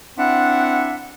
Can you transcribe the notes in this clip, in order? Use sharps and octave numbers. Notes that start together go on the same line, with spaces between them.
C4 D4 E4 E5 F#5